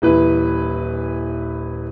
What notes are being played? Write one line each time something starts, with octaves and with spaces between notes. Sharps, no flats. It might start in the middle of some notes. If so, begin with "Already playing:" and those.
D#1 E3 B4